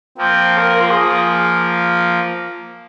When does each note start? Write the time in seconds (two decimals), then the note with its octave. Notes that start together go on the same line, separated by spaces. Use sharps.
0.17 F3 A#3 C4
0.58 A#4
0.69 A#4
0.80 F4
0.90 G#4
1.00 F3 A#3